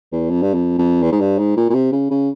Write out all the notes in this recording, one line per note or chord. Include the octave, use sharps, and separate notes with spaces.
E2
F2
G2
F2
F2
E2
G#2
G2
G#2
A#2
A#2
C3
C#3
C#3